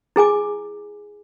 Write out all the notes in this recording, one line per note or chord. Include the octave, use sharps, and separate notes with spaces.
E4 G#4 G#5 D6